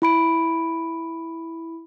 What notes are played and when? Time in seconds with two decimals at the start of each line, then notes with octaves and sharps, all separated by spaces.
0.02 E4 B5 D7